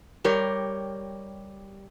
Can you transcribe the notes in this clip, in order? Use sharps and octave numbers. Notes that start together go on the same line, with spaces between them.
G3 G4 A#4 C#5